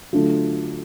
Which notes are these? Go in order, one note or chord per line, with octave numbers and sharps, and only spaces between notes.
D3 F#3 A3 D4 F4